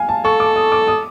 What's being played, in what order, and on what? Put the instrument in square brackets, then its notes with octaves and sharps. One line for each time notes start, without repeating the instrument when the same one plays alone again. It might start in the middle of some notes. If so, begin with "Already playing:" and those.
Already playing: [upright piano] F5 G#5
A5
[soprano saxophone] A4 [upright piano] C#6
[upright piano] D6
D#6
D6
D#6